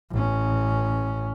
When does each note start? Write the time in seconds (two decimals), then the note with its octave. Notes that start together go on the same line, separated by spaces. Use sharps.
0.11 A1 C#4